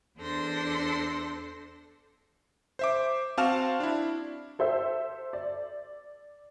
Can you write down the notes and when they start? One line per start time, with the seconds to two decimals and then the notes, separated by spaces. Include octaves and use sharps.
0.18 E2 D4 A4 C5 C6 A#6
2.79 C5 E5 D6
3.37 C4 F#4 F5 A5 F6 E7
3.80 D4 E4
4.59 A4 C5 E5 E6
5.33 D5